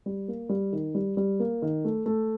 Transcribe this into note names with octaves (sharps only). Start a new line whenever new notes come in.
G3
A#3
G3
D#3
G3
G3
A#3
D#3
A3
A3